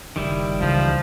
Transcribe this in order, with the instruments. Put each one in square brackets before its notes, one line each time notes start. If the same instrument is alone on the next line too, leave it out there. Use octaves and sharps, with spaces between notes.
[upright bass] F#1 [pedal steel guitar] D#3 G3 E4
[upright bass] C#2 E3 [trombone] F3